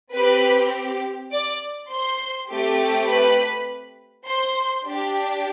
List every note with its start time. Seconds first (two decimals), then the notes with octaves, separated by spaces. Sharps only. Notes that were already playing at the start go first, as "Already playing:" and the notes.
0.14 C4 G4 B4 B5
1.32 D5 D6
1.90 C5 C6
2.49 A3 C4 G4
3.08 B4 B5
4.26 C5 C6
4.85 D4 G4